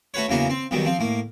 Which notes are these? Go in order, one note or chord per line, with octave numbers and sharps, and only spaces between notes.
A3 F#4 B4 C#5
E2 C#3 F#3 A#3 B3 A#5
C4
B1 B2 D#3 F#3 G3
F3 C4
A2 A#3